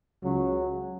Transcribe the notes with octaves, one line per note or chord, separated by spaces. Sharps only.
C#2 C#3 F#3